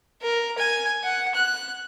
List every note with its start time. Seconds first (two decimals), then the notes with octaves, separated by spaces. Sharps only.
0.22 A#4
0.59 G#5
1.03 F#5
1.35 F#6